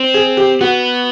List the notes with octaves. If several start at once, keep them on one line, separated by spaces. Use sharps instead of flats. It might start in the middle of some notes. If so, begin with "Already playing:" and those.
Already playing: C4
G#4
G4
B3 F#4